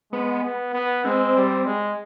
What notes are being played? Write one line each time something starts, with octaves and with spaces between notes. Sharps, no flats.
G#3 B3
B3
B3
G#3 C4
G3
G#3